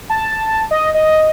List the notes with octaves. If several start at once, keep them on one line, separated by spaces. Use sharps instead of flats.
A5
D#5
D#5